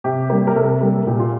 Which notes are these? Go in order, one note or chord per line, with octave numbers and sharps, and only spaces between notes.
C3 G4
G3 A#3
A#4
C3 A4
G3 A#3
A#2 G4
F4